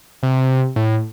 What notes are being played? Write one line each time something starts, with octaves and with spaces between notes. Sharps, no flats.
C3
A2